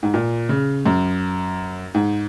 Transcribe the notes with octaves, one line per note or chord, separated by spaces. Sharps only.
G#2
A#2
C#3
F#2
G#2